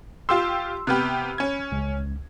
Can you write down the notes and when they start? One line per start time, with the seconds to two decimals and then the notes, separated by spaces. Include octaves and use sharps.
0.29 F4 G4 C6 E6
0.87 C3 B3 G4 B5 F6 F#6
1.38 C#4 G#6
1.72 C#2